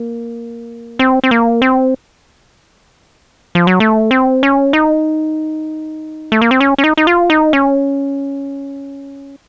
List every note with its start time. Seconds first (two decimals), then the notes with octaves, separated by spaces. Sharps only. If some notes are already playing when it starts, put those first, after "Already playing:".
Already playing: A#3
0.99 C4
1.24 C4
1.31 A#3
1.62 C4
3.55 F3
3.67 F#3
3.80 A3
4.11 C4
4.43 C#4
4.73 D#4
6.32 A3
6.42 A#3
6.51 C4
6.60 C#4
6.78 C#4
6.84 D#4
6.97 D#4
7.07 F4
7.30 D#4
7.53 C#4